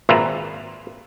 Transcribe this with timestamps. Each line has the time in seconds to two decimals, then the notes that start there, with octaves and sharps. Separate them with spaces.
0.09 G#1 A#2 F4 B4 E5 A#5